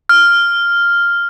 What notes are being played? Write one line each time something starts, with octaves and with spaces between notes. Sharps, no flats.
F6